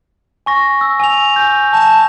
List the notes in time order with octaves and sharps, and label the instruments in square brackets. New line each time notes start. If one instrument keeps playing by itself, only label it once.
[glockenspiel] G#5 C#6 A#6
E6
G#5 E6 F7
G#5 G6
[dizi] A5